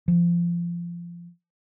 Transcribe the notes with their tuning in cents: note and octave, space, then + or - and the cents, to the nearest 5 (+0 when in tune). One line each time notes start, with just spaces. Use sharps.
F3 -20